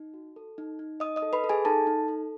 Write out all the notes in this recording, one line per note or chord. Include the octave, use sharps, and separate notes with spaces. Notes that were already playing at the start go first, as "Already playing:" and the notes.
Already playing: D#4
F#4
A4
D#4
D#4
D#4 D#5 D#6
D#5 D#6
A4
B4 B5
A4
G#4 G#5
D#4 A4 A5
D#4
A4